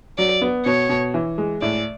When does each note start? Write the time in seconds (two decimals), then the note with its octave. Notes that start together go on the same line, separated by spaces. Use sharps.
0.18 F#3 D5
0.42 B3
0.66 B2 C#5
0.89 B2
1.14 E3
1.38 G#3
1.61 A2 D5